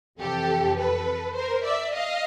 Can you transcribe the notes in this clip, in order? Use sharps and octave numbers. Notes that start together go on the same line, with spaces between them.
F2 C3 E3 G4 A4
A4 B4
A#4 C5
D5 E5
D#5 F5